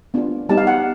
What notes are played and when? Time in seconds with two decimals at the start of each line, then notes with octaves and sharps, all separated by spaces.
0.14 B3 D4 F4
0.49 G3 B3 D#4 G4 A5
0.57 F5
0.67 F#5